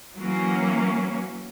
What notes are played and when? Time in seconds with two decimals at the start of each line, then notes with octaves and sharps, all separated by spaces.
0.17 E3 F#3 A#3 C#4